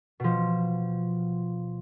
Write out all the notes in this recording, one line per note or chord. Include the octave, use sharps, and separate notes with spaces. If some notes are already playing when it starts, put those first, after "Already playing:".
B2 F3